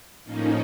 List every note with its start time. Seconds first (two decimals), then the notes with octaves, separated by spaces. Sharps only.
0.24 A2 F3 A#3 C#4 D#4